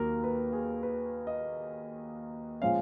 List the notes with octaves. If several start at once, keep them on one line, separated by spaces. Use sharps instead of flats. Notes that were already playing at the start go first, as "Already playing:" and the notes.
Already playing: D#2 D#3 F#3 A#3 A#4
B4
G#4
B4
D#5
A#2 F3 G#3 C#4 F5